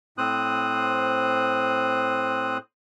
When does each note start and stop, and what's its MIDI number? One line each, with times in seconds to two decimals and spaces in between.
0.18 2.58 45
0.18 2.58 60
0.18 2.58 72
0.18 2.58 87
0.18 2.58 90